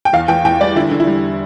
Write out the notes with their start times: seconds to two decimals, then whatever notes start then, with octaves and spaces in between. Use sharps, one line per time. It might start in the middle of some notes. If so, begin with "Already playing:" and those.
0.05 G5
0.13 E2 F5
0.28 E3 G5
0.45 E2 G5
0.60 G3 D5
0.76 D3 E4
0.91 D3
1.00 E4
1.07 G3